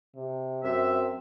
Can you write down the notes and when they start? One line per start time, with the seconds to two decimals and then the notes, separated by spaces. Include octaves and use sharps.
0.16 C3
0.63 F#2 C4 E5